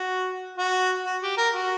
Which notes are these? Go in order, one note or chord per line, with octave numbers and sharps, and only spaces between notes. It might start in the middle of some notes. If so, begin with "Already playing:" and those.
Already playing: F#4
F#4
F#4
G4
A#4
F#4